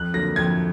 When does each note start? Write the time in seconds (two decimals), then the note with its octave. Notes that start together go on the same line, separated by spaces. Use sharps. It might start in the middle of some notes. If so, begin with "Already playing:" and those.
Already playing: F2 F#6
0.14 D3 F#3 A#3 A#6
0.36 F2 G#6